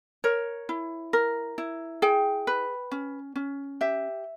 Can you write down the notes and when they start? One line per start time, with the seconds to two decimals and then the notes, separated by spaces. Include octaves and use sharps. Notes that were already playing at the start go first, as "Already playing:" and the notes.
0.24 A#4 C#5
0.69 E4
1.13 A#4
1.58 E4
2.02 G#4 G5
2.47 B4
2.92 C#4
3.36 C#4
3.81 G4 E5